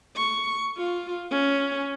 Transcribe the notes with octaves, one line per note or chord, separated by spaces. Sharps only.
C#6
F4
C#4